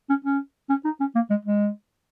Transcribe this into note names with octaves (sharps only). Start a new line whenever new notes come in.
C#4
C#4
C#4
D#4
C#4
A#3
G#3
G#3